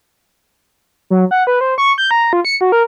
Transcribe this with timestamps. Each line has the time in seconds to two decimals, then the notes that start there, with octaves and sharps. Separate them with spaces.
1.10 F#3
1.31 F#5
1.47 B4
1.61 C5
1.78 C#6
1.98 G6
2.11 A#5
2.33 F4
2.45 C#7
2.61 F#4
2.72 A#4